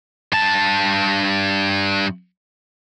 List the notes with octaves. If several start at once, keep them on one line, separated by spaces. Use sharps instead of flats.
G2 A5